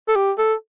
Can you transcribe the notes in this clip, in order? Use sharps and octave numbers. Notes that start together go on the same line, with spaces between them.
A4
G4
A4